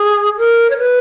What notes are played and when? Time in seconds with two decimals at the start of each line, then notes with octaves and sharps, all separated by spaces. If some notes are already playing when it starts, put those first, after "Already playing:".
Already playing: G#4
0.38 A#4
0.70 C#5
0.78 B4